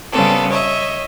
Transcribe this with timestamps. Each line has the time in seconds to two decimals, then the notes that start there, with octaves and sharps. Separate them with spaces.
0.12 C#3 G3 B3 C4 A4
0.50 C#5 D#5 E5